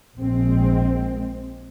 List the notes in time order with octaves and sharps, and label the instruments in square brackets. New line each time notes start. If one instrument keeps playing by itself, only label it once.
[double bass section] A#1 G#3 C4